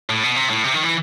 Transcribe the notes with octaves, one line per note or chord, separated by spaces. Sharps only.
A2
B2
C3
A2
C3
D#3
E3